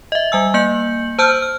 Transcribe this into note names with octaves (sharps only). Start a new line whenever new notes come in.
D#5 E5
G3 G#5 E6
A#3 G6 C#7 F#7
C5 A5 E6 F6 G6
F6